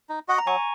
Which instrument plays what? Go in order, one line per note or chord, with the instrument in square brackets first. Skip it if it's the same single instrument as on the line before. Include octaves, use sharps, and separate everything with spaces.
[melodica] D#4
F#4 D#5 F#5
[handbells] A#5
[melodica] F#3 [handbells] G#5 C#6